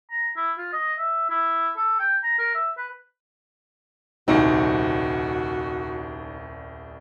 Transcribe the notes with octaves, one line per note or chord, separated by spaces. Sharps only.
A#5
E4
F4
D#5
E5
E4
A4
G5
A#5
A#4
E5
B4
D#1 C2 C4 D#4 F#4